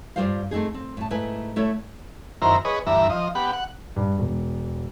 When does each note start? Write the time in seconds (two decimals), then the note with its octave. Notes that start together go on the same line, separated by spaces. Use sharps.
0.16 G2 F#3 G3 F4 C5 F5
0.51 A3 C4 D#4 G#4
0.74 C4
0.97 A2 A5
1.10 G#2 A3 E4 B4 G#5
1.56 A3 E4 A4 C#5
2.42 F#2 D#3 E4 A#4 C5 A#5
2.65 G#4 B4 C#5 D#5
2.87 D2 G2 E3 E5 A#5
3.10 F3 D#5
3.35 B3 G4 F#5 B5
3.53 F#5
3.96 G2
4.19 E1